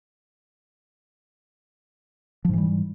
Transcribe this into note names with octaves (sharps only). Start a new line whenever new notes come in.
G#2 E3 F3 G3